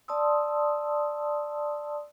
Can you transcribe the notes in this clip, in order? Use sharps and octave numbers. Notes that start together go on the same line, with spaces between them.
D5 A5 C6 D#6 E6